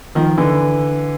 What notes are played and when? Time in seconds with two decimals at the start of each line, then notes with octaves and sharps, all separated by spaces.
0.15 D#3 F3
0.38 D3 E3